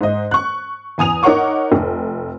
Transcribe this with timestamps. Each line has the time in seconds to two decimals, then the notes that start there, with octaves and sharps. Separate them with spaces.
0.01 G#2 D#5
0.31 C#6 F#6
0.98 E2 G#5 D#6 F7
1.23 D#4 A#4 C#5 F#5 C#6 D6
1.72 F1